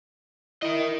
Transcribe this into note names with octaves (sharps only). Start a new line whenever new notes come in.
E4 A#4 D#5